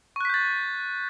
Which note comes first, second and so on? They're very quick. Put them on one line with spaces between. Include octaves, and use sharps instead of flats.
C#6 F#6 B6 G6 A6